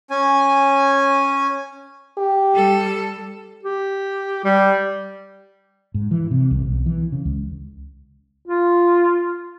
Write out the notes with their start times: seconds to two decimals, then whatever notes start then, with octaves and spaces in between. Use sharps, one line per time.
0.10 C#4 G#5
2.18 G4
2.54 G3 A4
3.63 G4
4.44 G3
5.94 G#2
6.11 E3
6.31 C3
6.51 C2
6.65 B1
6.86 E3
7.12 C#3
7.25 C#2
8.47 F4